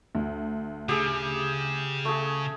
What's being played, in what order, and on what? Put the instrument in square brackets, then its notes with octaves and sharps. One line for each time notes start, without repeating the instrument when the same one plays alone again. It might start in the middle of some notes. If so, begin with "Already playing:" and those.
[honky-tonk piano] D2
[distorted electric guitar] C#3 [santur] G4 G#4
[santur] A3 G#4